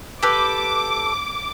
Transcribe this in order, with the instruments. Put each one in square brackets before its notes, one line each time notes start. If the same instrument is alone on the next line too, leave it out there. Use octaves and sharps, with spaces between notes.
[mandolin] G4 A4 B4 [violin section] D6